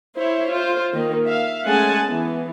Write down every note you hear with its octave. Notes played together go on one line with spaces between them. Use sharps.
E4 C5 C#5 E5
F4 C5
D#3 A#3 D#4
E5 F5
G#3 A3 C#4 F#5 G#5 A5
E3 B3